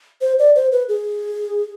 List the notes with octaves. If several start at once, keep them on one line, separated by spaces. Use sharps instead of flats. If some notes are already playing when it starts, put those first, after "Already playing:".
C5
D5
C5
B4
G#4